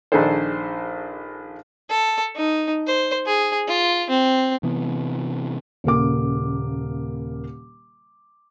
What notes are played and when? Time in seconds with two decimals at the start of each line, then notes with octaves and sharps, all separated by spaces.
0.12 A#1 D#3 D4 G#4 A4 C5
1.90 A4
2.35 D#4
2.87 C5
3.26 G#4
3.68 F4
4.10 C4
4.63 C3 E3 B3
5.84 D#1 C#3 A#3 D6